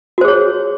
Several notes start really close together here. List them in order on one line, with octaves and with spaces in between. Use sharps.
F#4 C5 G#4 C#5